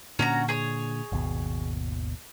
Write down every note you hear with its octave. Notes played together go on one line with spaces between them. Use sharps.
A#2 D3 C#4 F#4 A#5
G#4 C#5
G#1 D#2 B2